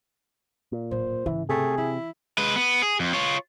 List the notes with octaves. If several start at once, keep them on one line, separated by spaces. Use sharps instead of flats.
A#2
D1 A2 C5
G#2 C#3 E3
C3 A3 G#4
E3 E4
G#3 B4
B3
G#4
F2
F4 C#5